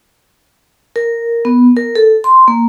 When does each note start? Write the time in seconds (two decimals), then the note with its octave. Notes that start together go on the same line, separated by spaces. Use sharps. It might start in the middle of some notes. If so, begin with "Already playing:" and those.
0.96 A#4
1.45 B3
1.77 A#4
1.95 A4
2.24 C6
2.48 A#3